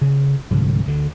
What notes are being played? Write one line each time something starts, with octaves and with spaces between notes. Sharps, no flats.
C#3
C2 G#2 D3 F3
D2 D3